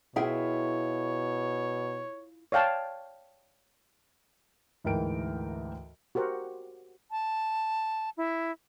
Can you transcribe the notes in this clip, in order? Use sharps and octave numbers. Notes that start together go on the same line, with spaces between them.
B2 E4 F4 G#4 C#5 E5 G5
C#5 D5 F5 G5 A5
D2 G#2 E3 A#4 G5 D7
F#4 G4 A#4 C5 F#5
A5
E4